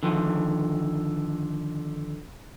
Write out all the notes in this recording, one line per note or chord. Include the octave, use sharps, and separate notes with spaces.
D3 D#3 F3